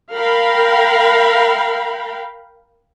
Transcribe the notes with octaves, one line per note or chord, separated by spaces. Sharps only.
A#4 F5 G5 B5